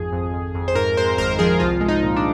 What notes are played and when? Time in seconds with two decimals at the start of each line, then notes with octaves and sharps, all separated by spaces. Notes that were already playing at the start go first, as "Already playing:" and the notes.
Already playing: G#1 F2 G#4
0.12 F2
0.34 F2
0.55 F2
0.68 C5
0.75 G#2 A#4
0.97 G#3 C5
1.18 G#1 A#4
1.39 F3 G#4
1.60 C2 F4
1.81 G#3
1.88 D#4
2.03 A#2
2.16 D4